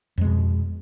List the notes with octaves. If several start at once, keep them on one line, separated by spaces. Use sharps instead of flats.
F2 B2 G#3